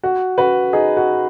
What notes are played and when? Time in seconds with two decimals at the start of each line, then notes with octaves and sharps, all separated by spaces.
0.03 F#4
0.38 F#4 B4
0.73 D#4 G#4
0.97 F#4